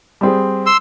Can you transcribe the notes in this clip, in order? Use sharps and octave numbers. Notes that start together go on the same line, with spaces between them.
G3 C4 G#4
C6 E6